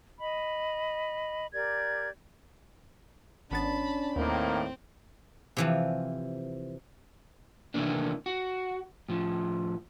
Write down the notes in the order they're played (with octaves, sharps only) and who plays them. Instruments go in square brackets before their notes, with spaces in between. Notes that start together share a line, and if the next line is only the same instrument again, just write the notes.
[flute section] D#5 B5
G4 A#4 D5 G#6
[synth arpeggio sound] G#1 B3 A6 [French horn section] C#4 D4 [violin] A5 B5
[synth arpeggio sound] D#2 [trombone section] A2 D#3 A#3 [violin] C4
[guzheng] C3 E3 F3
[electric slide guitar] C3 D#3 E3 A3 A#3 D4
F#4
A2 F3